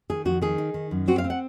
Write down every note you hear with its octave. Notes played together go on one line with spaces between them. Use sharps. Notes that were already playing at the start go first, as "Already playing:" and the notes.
D#3 G#4
F2 F#4
D#3 G#4
D#4
D#3
F#2
C4 F#4
F5
C4
F#5